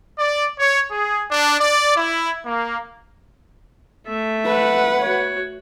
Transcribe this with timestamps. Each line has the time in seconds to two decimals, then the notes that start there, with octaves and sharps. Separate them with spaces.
0.19 D5
0.60 C#5
0.92 G#4
1.31 D4
1.60 D5
1.96 E4
2.45 A#3
4.07 A3 E5
4.45 B4 F#5
5.00 F#4 C#5